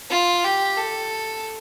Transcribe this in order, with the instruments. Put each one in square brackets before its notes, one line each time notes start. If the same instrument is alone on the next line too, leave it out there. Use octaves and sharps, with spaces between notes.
[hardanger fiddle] F4
G4
A4